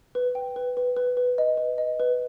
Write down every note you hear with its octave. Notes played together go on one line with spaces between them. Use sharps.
B4
G5
B4
B4
B4
B4
D#5
B4
D#5
B4